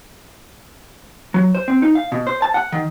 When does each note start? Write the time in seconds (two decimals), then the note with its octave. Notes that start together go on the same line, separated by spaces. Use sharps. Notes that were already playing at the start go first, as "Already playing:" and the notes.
1.34 F#3
1.55 C5
1.68 C4
1.82 D#4
1.95 F5
2.12 B2
2.27 C5
2.42 A5
2.54 F#5
2.72 D#3